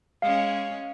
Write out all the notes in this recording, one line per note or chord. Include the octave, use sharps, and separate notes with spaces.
G#3 C#4 F5